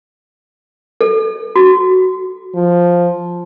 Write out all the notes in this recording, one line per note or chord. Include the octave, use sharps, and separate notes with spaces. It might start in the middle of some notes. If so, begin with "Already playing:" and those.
A4
F#4
F3